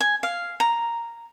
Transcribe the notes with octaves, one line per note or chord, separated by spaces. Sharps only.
G#5
F5
A#5